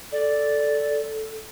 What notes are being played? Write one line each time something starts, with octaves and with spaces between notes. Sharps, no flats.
A4 D5